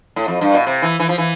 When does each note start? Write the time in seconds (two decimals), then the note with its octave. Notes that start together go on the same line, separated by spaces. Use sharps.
0.16 A2
0.28 F2
0.41 G2
0.54 B2
0.67 C3
0.82 E3
1.00 E3
1.09 F3
1.18 E3